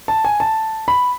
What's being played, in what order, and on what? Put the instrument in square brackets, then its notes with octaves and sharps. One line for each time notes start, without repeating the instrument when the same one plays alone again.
[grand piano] A5
G#5
A5
B5